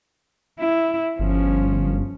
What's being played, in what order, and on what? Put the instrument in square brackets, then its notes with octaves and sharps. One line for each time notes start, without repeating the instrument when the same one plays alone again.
[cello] E4
[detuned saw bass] G1 [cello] F3 C#4